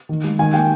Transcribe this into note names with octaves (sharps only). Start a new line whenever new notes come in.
D#3
G#3
D#3 G#5
A#3 G5